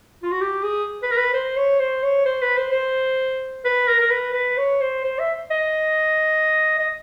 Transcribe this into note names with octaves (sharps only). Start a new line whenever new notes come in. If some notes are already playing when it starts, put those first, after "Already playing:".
F4
F#4
G4
G#4
B4
A#4
B4
C5
C#5
C5
C#5
C5
B4
C5
C5
B4
A#4
A#4
B4
B4
C#5
C5
C5
E5
D#5
D#5